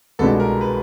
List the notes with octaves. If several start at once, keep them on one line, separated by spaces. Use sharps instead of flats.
C2 B2 G#3 B3 D4 A4
A#4
B4